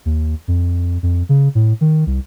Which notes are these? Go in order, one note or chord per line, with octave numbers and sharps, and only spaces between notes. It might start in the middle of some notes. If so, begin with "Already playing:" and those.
D#2
F2
F2
C#3
A2
D#3
C2